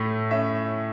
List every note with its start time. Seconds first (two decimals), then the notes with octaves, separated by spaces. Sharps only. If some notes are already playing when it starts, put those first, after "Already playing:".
Already playing: A2 A3
0.31 C#4 E5